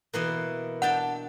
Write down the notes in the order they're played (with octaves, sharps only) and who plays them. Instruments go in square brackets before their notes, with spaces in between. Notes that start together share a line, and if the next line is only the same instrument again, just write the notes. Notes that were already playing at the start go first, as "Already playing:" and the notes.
[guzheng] B2 E3 A#3
[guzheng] D4 G5 A5 [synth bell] F#5